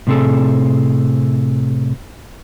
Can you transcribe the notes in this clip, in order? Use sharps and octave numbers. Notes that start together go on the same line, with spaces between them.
A2 C3 C4 G#4 A4